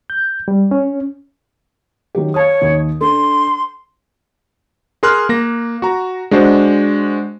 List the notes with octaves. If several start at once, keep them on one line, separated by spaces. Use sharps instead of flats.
G6
G3
C#4
D#3 F#3 G4
C#5 F5 A5 D#6
D#2 D#3
D4 A4 C6
G#4 A#4 C6 F6 F#6
A#3 A#6
F#4 A#5
G#3 D4 F#4 C5